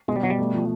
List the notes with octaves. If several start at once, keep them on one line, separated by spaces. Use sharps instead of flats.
B2 G#3
G3
B2 F#3
G3
A3
F3